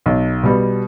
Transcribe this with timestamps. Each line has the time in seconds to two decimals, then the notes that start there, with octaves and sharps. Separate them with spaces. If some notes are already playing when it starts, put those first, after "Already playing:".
0.06 B1
0.43 B2 G3 B3